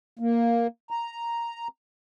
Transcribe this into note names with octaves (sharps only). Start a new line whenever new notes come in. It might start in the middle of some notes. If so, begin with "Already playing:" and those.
A#3
A#5